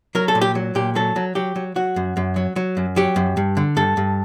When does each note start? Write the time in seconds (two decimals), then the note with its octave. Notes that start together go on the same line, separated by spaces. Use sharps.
0.15 F#3 A#4
0.28 A4
0.35 A#2
0.41 G4
0.55 F#3
0.75 A#2 G4
0.95 F#3 A4
1.16 F#3
1.35 F#3 G4
1.56 F#3
1.76 F#3 F#4
1.96 F#2
2.17 F#2
2.36 F#3
2.56 F#3
2.77 F#2
2.96 F#3 G4
3.16 F#2
3.37 G2
3.57 D3
3.77 G2 A4
3.97 G2